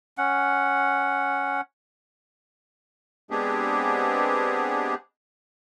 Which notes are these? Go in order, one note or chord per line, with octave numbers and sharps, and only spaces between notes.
C#4 F#5
G#3 B3 C4 D4 G4 G#4